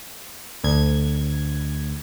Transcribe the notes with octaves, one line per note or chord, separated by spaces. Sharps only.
D2 G#6